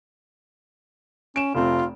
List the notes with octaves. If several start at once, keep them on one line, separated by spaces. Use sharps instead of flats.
C#4 D7 E7
F1 A3 C4 F4